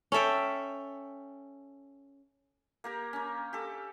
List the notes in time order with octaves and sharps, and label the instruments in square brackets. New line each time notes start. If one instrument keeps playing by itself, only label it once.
[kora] C#4 A4 E5 G5
[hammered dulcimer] A#3 G4 A#4
C#4 A#4
G4 A4